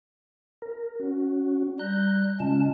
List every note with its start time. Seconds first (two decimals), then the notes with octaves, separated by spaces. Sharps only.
0.62 A#4
1.00 C#4 F#4
1.79 G3 A#5 F#6 G6
2.40 C#3 G#3 C#4 F4 A5